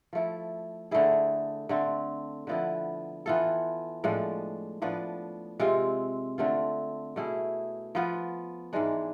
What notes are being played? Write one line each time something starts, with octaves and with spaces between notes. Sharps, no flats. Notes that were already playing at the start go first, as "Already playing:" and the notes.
F3 A3 E4
D3 A3 E4 G#4
D3 A3 C4
D3 F3 B3 E4
E3 B3 F4 A4
A2 F3 G#3 D4
A2 F3 B3 D4
C3 G#3 C4 F4
D3 A3 C4 F4
B2 A3 E4 G#4
F3 B3 F4
G#2 E3 G#3 D4